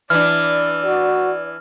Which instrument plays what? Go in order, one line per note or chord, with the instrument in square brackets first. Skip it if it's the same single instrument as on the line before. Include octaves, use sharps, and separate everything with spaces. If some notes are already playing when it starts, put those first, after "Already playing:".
[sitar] E3 D4 [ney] D5 [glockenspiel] F6
[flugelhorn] F#4